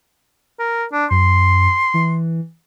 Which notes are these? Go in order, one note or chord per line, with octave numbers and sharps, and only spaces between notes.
A#4
D4
F#2 C6
E3